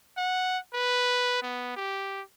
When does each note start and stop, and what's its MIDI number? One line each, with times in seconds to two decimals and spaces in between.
0.17 0.58 78
0.74 1.39 71
1.42 1.72 59
1.76 2.22 67